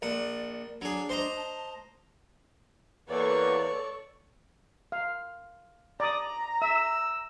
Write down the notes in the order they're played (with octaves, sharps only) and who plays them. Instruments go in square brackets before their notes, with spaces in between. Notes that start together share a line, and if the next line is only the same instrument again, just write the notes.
[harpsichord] A#1 F#5 [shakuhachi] D5
[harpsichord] F#3 G#4 [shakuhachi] D4
[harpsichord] C5 D#5 A#5
[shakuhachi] A5
[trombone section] E2 A#3 [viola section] A4 D5 [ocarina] B4 [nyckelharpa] C#5 C#6
[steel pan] F5
[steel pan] D5 D#6 [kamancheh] A#5
[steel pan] E5 [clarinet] E6